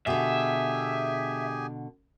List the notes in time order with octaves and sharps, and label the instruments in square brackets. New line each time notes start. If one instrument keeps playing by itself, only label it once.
[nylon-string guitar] B2 D3 [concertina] G4 G#4 G#5 [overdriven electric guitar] E5